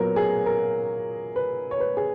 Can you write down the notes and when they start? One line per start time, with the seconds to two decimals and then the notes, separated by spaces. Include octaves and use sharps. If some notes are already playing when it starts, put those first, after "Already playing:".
Already playing: A#2 F#3 B3 A#4
0.16 G#4
0.46 A#4
1.36 B4
1.71 C#5
1.80 B4
1.97 G#4